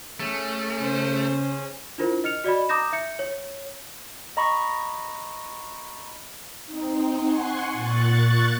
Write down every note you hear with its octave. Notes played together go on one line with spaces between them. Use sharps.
A3 C#4 G#4
C#3 C5
D4 E4 F4 A#4 C5
D#5 F6 C#7 F7
F#4 D5 D#5 B5
A#5 D6 D#6 G6 A#6 E7
E5 G6 C#7
C#5
D#5 A#5 B5 C#6 A#6
C4 D#4
F#5 G#5 C6 C#6
A#2 C#6 F#6 A6